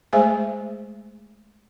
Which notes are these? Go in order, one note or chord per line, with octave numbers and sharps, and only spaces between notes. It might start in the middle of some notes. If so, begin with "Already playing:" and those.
G#3 A3 G#4 C5 D#5 G#5